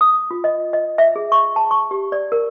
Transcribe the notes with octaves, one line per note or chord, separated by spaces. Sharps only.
D#6
F4
D#5
D#5
E5
G#4
C#6
A5
C#6
G4
D5
A#4